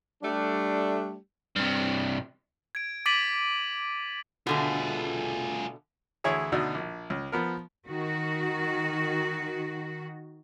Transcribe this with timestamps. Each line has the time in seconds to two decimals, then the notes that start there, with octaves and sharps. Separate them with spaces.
0.23 G3 A3 D4
1.56 G2 C3
2.75 G#6 D7
3.06 D6 A6 B6 D7 D#7 F#7
4.47 B2 D3 A3 F4 G#4
6.24 D2 E3 E4 G#4 C#5 E5
6.52 D2 B2 D4 D#4 E5
6.75 A#1
7.10 C#2
7.32 F3 B3 A#4
7.88 D#3 F#4